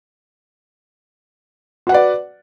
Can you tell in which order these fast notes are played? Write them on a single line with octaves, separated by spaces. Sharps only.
F#4 F#5 B4 D5